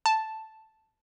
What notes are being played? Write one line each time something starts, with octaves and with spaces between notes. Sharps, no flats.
A5